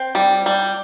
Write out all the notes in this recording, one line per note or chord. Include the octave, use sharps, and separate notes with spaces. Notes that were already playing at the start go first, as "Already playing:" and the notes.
Already playing: C4
G3
G3